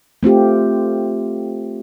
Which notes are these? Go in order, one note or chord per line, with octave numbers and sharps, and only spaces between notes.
A3 C4 F4 G4